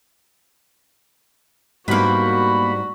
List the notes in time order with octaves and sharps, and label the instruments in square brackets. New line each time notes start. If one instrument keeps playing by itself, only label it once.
[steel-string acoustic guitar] G#2 G3 D4 [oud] A#3 B3 [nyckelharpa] F#4 [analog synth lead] B5